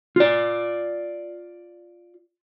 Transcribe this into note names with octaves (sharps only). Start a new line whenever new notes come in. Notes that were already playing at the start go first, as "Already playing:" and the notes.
F4 D5